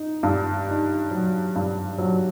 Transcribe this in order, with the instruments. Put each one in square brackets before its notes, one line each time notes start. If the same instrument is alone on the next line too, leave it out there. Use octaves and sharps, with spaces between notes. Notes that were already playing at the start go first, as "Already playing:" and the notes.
Already playing: [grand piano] D#4
G2
D#4
F#3
G2
F#3